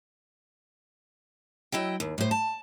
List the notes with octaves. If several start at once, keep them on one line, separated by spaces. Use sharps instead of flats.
F#3 E4 D#5 G5
D#2
A2 C5
A5